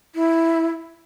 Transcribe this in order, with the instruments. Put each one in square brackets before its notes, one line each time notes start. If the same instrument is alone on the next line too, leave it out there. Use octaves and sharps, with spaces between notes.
[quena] E4